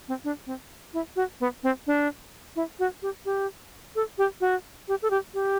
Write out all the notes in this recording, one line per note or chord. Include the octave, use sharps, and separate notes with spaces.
C4
D4
C4
E4
F#4
B3
C4
D4
E4
F#4
G4
G4
A4
G4
F#4
G4
A4
G4
G4